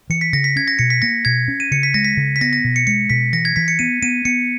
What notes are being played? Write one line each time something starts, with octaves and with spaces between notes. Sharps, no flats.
E3 C#7
B6
C#3 A#6
B6
C#4 G#6
A#6
B2 C#7
B6
A#3 A#6
B2 G#6
C#4
D#7
C#3 C#7
B6
G#3 A#6
B6
C#3
B6
B3 A#6
A#6
B2
C#7
G#3 C#7
B2 B6
E3 A#6
G#6
E3 B6
C#7
B3 D#7
B3 D#7
B3 C#7